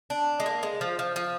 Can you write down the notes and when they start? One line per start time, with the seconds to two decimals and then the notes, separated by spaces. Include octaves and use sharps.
0.10 D4
0.40 G#3
0.46 A#3
0.63 G#3
0.81 F3
0.99 F3
1.16 F3